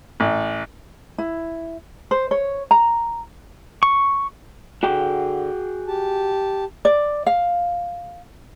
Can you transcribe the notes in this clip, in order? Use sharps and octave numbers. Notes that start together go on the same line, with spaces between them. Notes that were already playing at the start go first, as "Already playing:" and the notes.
A1
E4
C5
C#5
A#5
C#6
D3 F#4 G#4 G5
G4 A5
D5
F5